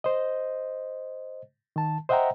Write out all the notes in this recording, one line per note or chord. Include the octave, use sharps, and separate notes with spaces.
C5 D#5
D#3 A5
C5 D#5 E5 F#5 G5 A#5